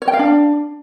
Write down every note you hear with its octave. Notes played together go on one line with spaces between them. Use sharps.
C#5
G5
F5
D4